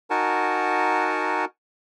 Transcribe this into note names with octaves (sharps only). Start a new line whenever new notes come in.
D#4 F#4 A#4 F#5 G#5 A5